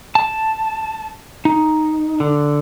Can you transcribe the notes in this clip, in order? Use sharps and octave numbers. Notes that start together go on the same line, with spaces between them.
A5
D#4
D3